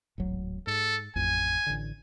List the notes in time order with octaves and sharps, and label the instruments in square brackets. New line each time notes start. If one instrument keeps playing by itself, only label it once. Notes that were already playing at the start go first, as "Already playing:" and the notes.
[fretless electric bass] D1 G#1 F#3
[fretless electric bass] G#2 [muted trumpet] A4
[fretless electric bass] A1 F2 [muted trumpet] G#5
[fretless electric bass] A1 D3